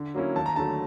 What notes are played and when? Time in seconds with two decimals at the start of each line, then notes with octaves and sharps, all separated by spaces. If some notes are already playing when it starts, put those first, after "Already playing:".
Already playing: D3
0.14 F#3 A#3 C#4 E4
0.36 D#2 A5
0.46 A#5
0.56 D3 F#3 A3 A5